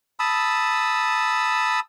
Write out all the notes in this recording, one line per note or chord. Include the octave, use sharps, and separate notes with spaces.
A5 B5 D#6 E6